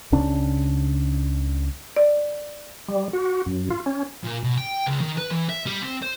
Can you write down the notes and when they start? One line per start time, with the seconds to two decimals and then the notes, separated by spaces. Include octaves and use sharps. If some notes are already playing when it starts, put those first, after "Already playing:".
0.12 C#2 C#3 C#4 D4
1.96 D5
2.88 G3
3.13 F#4
3.46 F#2
3.70 F4
3.86 C#4
4.24 A#2
4.44 B2
4.57 G5
4.87 C#2
5.01 D#3
5.18 B4
5.31 E3
5.49 E5
5.66 G3
5.82 C4
6.03 C5